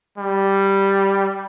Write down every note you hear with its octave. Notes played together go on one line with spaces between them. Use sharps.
G3